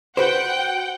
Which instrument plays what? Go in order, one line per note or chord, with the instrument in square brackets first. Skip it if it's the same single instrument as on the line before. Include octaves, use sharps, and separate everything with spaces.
[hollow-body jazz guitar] F#4 B4 C5 [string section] F#5 G5